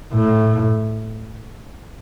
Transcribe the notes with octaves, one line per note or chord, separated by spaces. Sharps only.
A2